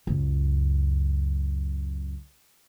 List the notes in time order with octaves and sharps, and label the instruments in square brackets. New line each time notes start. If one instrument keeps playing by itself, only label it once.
[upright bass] C#2 F#2